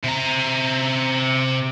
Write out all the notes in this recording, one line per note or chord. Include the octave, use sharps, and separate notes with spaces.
C3 A#5